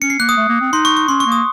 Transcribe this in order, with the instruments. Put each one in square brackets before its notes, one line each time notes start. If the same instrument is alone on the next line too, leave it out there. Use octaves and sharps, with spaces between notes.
[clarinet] C#4 [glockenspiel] C#7
[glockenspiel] C7
[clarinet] A#3 [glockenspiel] F#6
[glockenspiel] D#6
[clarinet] A3
A#3
C4
[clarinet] D#4 [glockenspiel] C6
[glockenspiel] C#6
C#6
[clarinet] C#4 [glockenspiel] C6
[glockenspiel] C#6
[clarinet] A#3
[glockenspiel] D#6